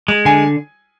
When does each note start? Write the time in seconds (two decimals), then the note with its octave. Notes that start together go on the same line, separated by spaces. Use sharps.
0.08 G#3
0.25 D3 G#5